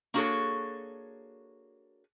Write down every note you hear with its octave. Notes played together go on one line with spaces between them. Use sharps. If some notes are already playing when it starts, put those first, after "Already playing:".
A#3 D4 F#4 G#4 A4 C#5